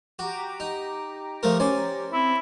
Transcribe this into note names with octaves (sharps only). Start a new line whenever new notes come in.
F#4 G4 A#5 D6
D#4
F3 A3 A#4
C#4 C5 D5 G#5
C4 E4